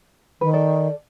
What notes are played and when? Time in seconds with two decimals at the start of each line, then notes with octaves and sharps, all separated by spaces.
0.41 D#3 B4
0.53 A4 D5